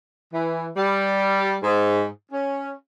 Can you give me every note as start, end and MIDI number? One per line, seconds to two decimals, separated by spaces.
0.33 0.69 52
0.76 1.56 55
1.63 2.05 44
2.31 2.71 61